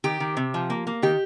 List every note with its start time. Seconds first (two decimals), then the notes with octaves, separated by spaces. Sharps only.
0.04 D#3 G4
0.20 D#3
0.37 C3
0.54 F3
0.70 A#3
0.87 A#3
1.02 D#3 G4